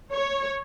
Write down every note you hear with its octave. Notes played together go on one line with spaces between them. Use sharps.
C#5